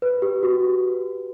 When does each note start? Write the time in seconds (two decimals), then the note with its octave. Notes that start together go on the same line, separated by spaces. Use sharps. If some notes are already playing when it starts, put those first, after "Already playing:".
0.02 B4
0.22 G4
0.43 F#4